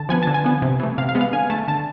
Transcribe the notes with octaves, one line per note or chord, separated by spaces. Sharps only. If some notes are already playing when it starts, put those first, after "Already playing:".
Already playing: D3 A5
F3 B3 G#5
D3 A5
G#5
F3 B3
C3
E3 A3
C3 F5
F5
G#3 B3
F5
D3 G#5
A3 A5
D3 A5